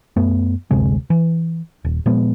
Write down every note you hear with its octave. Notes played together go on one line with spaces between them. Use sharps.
F#2 A3 B3
F#1 D2 C3 G#3
E3
D#1
A#2 F3 G#3 B3